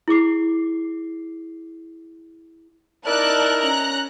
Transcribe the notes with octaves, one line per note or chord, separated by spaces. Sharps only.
E4 G#4 D6 C7
D#4 E4 A#4 D5 A5 F#6
C#4 A#5 F#6